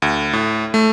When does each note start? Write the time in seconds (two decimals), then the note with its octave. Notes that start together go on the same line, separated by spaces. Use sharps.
0.02 D2
0.33 A2
0.74 A3